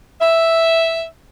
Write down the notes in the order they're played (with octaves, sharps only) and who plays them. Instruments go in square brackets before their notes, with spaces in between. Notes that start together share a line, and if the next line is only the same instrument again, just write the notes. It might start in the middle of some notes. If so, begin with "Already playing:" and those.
[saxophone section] E5